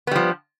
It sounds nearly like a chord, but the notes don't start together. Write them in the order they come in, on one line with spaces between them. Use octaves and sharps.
B3 G3 F3